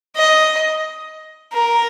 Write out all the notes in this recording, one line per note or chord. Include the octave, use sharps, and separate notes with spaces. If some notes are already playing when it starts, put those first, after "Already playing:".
D#5
A#4